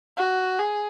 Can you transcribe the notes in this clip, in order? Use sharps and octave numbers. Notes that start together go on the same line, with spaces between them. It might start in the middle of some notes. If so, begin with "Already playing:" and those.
F#4
G#4